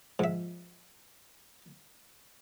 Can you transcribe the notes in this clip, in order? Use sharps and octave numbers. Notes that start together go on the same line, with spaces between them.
G#2 F3 E5